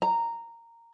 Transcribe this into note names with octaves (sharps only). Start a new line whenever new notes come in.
A#5